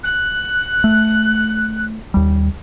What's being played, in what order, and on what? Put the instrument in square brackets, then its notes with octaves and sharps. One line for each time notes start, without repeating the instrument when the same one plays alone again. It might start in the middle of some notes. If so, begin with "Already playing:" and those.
[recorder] F#6
[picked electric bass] A3
D#2 G3